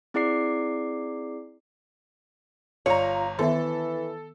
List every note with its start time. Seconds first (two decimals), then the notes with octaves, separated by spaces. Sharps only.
0.14 C4 E4 G#4 D5 D6 C7
2.86 G1 F4 C#5 A#5
3.39 D#3 E3 B3 A4 E5